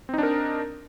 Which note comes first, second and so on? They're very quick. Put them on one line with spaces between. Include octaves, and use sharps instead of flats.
C4 D#4 D4 A#4